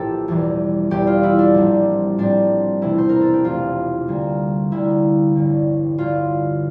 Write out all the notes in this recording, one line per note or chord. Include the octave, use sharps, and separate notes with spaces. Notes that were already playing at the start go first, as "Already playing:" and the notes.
Already playing: A#1 A2 E3 G4 A4
E1 E2 E3 G3
E1 E2 E3 G3 G4
F4
E4
D4
A#1 A2 G3 C4
A#1 A2 G3 C4 D4
E1 E2 C3 E3 A3 E4
C5
A#4
A4
G4
E1 E2 C3 E3 A3 F4
D2 D3 G3 A#3
D2 D3 G3 A#3 E4
A1 G2 D3
A1 G2 D3 F4